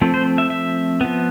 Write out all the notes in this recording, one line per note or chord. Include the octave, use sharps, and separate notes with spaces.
F3 A3 C4
C5
E5
E5
F3 B3